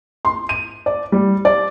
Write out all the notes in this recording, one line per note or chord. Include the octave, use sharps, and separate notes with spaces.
C6
D#7
D5
G3
D5